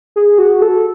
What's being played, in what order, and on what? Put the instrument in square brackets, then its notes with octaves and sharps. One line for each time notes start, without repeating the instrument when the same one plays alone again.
[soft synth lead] G#4
F#4
A4